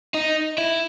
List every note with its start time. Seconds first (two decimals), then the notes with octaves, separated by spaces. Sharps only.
0.14 D#4
0.58 E4